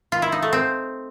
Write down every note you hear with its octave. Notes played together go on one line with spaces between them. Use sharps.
F4
E4
D#4
A3
C4